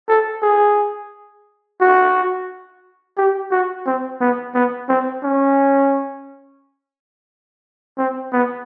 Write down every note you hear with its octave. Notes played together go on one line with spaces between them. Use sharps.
A4
G#4
F#4
G4
F#4
C4
B3
B3
C4
C#4
C4
B3